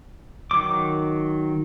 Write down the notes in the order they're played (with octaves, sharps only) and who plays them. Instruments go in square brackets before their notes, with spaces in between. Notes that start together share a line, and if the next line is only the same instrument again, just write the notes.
[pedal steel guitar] D#3 F#3 D6